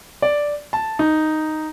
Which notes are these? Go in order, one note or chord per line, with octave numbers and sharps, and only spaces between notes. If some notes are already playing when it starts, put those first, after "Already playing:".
D5
A5
D#4